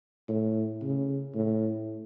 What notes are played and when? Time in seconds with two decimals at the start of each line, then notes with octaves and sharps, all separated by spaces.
0.28 A2
0.82 C#3
1.35 A2